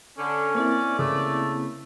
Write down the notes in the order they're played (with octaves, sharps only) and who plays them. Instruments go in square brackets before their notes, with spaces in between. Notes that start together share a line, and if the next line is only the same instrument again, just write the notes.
[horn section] D3 [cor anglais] C#4
[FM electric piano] A#3 C4 E4 [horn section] D5
[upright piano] C#3 [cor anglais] A3